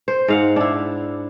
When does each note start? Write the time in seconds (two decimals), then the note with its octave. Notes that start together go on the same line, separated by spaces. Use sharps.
0.08 C5
0.28 G#2 F5 F#5
0.56 D4 E4